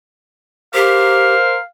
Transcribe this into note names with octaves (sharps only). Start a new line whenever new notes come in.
G4 A#4 C5 F5